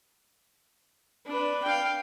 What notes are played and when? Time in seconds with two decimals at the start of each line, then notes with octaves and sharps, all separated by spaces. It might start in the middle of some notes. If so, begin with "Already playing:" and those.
1.26 D4 B4
1.64 F5 G5